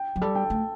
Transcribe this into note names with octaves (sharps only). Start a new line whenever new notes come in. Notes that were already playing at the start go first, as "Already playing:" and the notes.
Already playing: G5
F#3
G3 A4
G5
A3